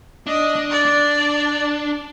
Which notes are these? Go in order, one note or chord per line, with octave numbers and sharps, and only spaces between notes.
D4 D#5
D4
D5
D4